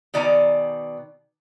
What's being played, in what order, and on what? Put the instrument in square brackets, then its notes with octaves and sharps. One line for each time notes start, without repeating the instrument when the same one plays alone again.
[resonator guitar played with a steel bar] B2 D#3 D5 G#5 A#5